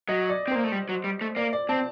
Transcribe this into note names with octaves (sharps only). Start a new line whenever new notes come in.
F#3 D#5
D5
C4
A#3 C5
A3
G3
F#3
G3
A3
A#3 D5
D5
C4 A5